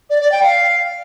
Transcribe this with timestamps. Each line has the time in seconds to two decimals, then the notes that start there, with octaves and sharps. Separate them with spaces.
0.09 D5
0.20 D5
0.31 G5
0.42 F5